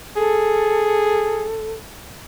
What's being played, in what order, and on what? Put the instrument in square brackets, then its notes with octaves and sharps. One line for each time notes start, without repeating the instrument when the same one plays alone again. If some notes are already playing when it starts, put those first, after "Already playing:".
[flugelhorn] G#4 [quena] A4